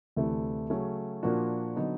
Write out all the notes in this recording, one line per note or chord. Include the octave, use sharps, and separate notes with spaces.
D2 C3 E3 A3
C#3 F#3 A3 C#4
A#2 F3 A#3 D4 F#4
D3 F#3 B3 D#4